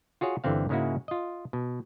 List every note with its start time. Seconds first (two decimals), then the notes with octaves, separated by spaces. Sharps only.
0.21 F4 F#4 G#4 C#5
0.44 G1 D3 E3 C4 F5
0.69 G#2 C#3 G#3 A#3 E4 F#4
1.08 F4 D#5
1.53 B2